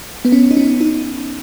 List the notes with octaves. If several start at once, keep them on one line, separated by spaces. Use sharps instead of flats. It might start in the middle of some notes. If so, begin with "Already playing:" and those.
B3
C#4
D#4
C#4
D#4